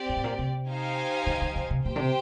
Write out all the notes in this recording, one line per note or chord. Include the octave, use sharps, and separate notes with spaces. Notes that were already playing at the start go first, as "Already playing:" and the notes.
Already playing: C4 G4 D5
G2
G#2
A#2
C3
D#4 G4 C5 F5 G#5
D3
D#3
D3
C3
A#2 G4 C5 G5
D3
C3